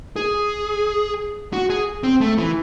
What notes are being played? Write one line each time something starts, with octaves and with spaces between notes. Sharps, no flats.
G#4
F#4
G#4
C4
A3
E3